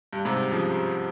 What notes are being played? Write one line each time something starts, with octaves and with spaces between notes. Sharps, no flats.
G2
G#2 C3
C#3 F3